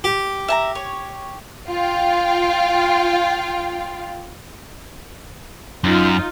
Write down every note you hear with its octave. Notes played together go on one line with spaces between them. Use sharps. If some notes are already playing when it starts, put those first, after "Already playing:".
G4
E5 A5 A#5
C#5
F4 F5 G5
F#2 D#4 F4